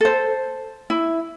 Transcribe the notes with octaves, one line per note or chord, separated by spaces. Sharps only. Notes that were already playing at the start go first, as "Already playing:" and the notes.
A4 C5
E4